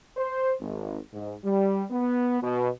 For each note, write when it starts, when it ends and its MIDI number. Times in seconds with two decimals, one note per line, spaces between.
0.17 0.53 72
0.60 0.98 32
1.12 1.34 44
1.43 1.84 55
1.90 2.37 59
2.43 2.69 47